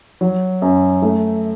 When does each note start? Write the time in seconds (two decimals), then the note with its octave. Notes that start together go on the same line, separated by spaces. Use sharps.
0.21 F#3
0.62 F#2
1.02 A3